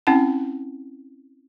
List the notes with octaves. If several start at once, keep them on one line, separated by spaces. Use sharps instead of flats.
C4 C#4 E4 F#5 A5